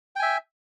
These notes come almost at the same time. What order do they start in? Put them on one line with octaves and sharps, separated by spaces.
G5 G#5 E5